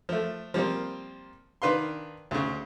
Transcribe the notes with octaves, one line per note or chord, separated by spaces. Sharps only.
F3 A3
F3 G3 A#3 C4
D#3 D4 B4 F5 C6
D2 C#3